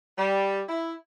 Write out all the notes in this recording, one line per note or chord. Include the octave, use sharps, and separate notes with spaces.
G3
E4